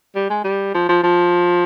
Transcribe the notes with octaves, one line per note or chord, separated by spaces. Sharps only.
G3
G#3
G3
F3
F3
F3